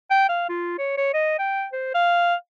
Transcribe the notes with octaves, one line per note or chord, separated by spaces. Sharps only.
G5
F5
F4
C#5
C#5
D#5
G5
C5
F5